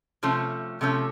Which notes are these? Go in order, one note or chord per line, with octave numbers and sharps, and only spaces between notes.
C3 F3 A3 C#4
C3 F3 A3 C#4